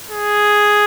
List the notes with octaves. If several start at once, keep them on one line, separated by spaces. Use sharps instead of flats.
G#4